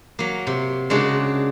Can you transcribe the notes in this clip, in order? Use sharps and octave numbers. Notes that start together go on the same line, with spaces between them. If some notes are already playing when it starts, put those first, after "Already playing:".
F#3 A#3
C3
C#3 G#3 A#3 D4 F#4